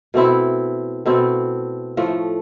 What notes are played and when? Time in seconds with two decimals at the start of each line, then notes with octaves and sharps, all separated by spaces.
0.14 B2 A3 C4 E4
1.06 B2 A3 C4 E4
1.97 A2 F3 A3